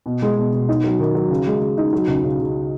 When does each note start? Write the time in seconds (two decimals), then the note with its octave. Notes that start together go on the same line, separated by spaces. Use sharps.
0.06 B2
0.22 G#3
0.37 B2
0.53 B2
0.69 D#4
0.84 F#3
1.00 D#3
1.15 F#3
1.30 C#3
1.47 G#3
1.61 C#3
1.78 D#4
1.93 F#3
2.07 C#2
2.24 C#3
2.39 C#3